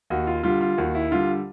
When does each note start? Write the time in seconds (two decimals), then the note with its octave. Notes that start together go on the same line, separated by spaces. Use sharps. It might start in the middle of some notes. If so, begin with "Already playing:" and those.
0.10 D#2 F#4
0.27 F4
0.43 D3 G3 F4
0.61 F4
0.78 D#2 F#4
0.95 E4
1.11 D3 G3 F4